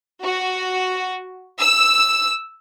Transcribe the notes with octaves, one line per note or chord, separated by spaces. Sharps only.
F#4
E6